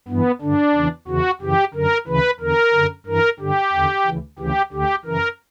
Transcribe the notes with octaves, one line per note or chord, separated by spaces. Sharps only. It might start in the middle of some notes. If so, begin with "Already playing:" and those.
G2 E3 B3
G2 D3 D4
E2 C#3 E3
E2 C#3 E3 F#4
F#2 C#3 E3 G4
F#2 D3 A#4
D2 C#3 E3 B4
E2 D3 A#4
F#2 D3
G2 E3 A#4
G2 D3 G4
E2 D3
D2 C#3 E3
D2 C#3 E3 G4
D2 D3 G4
F#2 C#3 E3 A#4